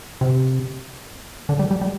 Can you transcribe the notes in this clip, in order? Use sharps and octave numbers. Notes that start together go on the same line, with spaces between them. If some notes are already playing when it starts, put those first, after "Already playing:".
C3
D3
G3
G3
G3